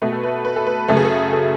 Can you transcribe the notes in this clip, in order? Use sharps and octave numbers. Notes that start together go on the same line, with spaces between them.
B2 A3 B4
A4
B4
B4
A4
B4
F#2 C#3 F#3 A3 A4
G#4
A4
A4